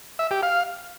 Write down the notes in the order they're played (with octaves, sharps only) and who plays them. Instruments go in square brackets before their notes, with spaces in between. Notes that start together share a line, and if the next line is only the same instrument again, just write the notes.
[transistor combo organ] E5
G4
F5